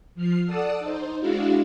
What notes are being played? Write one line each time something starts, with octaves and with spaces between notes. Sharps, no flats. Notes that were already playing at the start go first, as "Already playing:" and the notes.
F3 F6 C7
A4 D5 F#5 A5 D#6 E6
D#4 C5
G#3 D4 E4 F#4 E5 F5